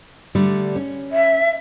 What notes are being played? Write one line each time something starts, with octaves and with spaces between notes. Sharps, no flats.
D3 G3 A3
C#4
E5